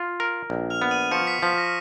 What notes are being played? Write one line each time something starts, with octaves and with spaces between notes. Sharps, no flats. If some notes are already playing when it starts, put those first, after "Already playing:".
Already playing: F4
A#4
A#1
F6 F7
B3
D#6 D#7
F3 C#6 C#7
B6
F3 B6
A#6